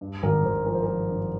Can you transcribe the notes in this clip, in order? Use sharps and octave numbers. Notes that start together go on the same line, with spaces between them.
G2
G#1 A#4
G#1 C5
F3 A#4
C5
A#4
F3
G2